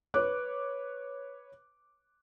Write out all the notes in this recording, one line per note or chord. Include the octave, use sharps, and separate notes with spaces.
B4 C#5 D6 F#6